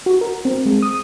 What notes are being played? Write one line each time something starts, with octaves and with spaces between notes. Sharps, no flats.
F#4
A#4
C4
G#3
D#6